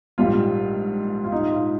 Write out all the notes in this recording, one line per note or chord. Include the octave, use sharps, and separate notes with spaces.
A#1 G#2 G3 F4
F4
D#4
F4